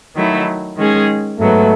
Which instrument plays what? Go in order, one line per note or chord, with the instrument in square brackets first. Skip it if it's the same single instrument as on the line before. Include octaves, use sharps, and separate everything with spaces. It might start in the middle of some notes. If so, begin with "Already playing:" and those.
[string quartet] D#3 F#3 A3 E4
D#3 G#3 C#4 G#4
[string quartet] G#2 F#3 B3 [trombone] A3